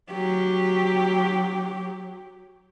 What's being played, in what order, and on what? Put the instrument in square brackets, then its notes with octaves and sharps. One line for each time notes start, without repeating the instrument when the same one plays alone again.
[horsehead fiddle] F#3 G4